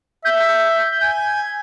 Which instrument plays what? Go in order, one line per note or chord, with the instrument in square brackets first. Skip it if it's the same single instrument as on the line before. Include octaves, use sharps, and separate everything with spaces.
[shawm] E5 [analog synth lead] G6
[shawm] G#5